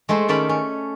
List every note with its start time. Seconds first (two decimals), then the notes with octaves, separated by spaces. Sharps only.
0.09 G#3 A3 A4 C5
0.28 D#3 A3 C#4 D5 A5 B5
0.49 C#4